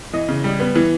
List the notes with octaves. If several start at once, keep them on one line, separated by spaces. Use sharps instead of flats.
E3 D#5
C#3
G3
B3
E3